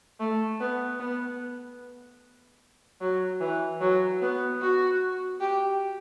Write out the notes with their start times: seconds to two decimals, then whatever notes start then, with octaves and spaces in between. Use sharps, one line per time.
0.20 A3
0.60 B3
0.99 B3
3.01 F#3
3.41 E3
3.81 F#3
4.21 B3
4.61 F#4
5.41 G4